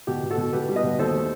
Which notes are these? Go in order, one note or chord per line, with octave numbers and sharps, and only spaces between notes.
B2 G4
B2
F#4 A4
B2
B2 G4 B4
G3
B4 D#5
B2
D#2 A4 C5
A3